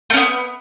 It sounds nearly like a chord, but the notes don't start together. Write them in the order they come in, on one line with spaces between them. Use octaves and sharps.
A3 C#4 B3